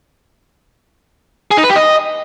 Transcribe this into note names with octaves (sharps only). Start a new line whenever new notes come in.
G#4
D#4
B4
G4
D#5